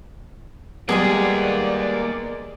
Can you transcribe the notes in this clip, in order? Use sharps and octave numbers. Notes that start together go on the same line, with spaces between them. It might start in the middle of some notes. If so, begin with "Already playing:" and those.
G3 G#3 A#3 B3 G#4 D5 D#5